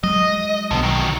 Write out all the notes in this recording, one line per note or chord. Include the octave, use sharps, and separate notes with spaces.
F#3 G#3 D#5
B1 D3 B3
D#3 F#3
D3